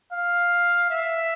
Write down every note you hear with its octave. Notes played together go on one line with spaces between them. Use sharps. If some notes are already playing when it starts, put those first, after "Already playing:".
F5
E5